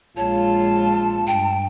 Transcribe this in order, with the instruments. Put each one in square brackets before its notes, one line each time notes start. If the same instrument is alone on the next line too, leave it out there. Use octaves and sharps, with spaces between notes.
[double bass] A#1 G#3 [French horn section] F4 [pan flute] C#5 [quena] A5
[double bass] G2 [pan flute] G5